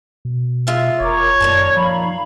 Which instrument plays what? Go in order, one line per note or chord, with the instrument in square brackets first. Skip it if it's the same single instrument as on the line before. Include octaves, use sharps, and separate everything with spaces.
[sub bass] B2
[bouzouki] G#3 F4 E5
[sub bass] F1 [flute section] A#4 A#5 D6 [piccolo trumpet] C#5
[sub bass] F#2 [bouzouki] A#2 D#3 A5 [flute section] C#6
[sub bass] F3 [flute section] F5 A#5 B5